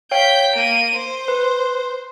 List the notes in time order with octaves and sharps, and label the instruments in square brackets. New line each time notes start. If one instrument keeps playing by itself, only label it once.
[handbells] C#5 F5 G5 [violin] G6 B6
[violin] A#3 D#7 [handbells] D7
[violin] C5
[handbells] B4